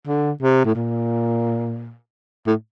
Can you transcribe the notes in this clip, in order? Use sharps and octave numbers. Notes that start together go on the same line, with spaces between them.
D3
C3
A2
A#2
A2